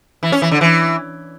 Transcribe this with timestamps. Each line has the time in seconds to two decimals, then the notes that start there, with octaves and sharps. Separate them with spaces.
0.23 E3
0.32 C#4
0.42 E3
0.51 D3
0.61 E3